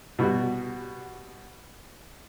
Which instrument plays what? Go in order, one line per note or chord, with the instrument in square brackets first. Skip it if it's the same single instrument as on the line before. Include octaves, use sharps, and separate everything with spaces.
[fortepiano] B2 G3 F#4